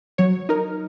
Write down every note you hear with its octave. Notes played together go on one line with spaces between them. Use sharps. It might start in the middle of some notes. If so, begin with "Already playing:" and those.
F#3 C#5
D#4 A#4